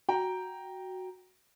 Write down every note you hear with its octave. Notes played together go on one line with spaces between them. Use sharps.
F#4 G5 A#5